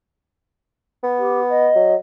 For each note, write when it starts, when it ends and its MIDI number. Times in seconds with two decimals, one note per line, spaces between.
1.03 1.70 59
1.18 1.40 67
1.49 1.92 75
1.75 1.96 54